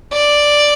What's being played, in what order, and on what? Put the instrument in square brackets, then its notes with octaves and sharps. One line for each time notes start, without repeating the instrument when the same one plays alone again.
[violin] D5